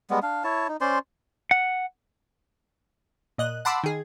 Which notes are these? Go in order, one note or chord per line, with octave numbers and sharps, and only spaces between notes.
G3 G#3 B3
D4 F5
E4 C#5 A5
D#4
C#4 C5 D5 C6
F#5
A#2 D#5 F#6
F#5 A5 B5 C6 D6 E6
D#3 G#4